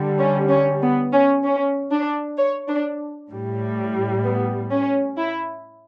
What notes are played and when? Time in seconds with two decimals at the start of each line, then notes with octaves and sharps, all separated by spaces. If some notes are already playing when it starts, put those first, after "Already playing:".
Already playing: D3 G3
0.19 C#4
0.50 C#4
0.81 B3
1.13 C#4
1.44 C#4
1.91 D4
2.37 C#5
2.68 D4
3.30 A2 G3
4.24 B3
4.71 C#4
5.17 E4